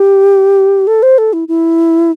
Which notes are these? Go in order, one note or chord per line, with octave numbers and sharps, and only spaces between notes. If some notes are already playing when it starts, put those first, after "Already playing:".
Already playing: G4
A4
C5
A4
E4
E4